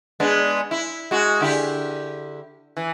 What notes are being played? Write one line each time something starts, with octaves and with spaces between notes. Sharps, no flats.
G#3 B3 D4
E4
G#3 F#4
D3 E4 G4
E3